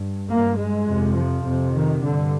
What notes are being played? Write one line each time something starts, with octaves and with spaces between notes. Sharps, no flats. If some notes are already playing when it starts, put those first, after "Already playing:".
Already playing: G2
G2 A#3
G#3
F2 C3
F3
F2 C3
D#3
G2 D3